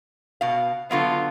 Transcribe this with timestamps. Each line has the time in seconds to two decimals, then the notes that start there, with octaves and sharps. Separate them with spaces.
0.41 B2 F5
0.91 D3 F#3 B3 F4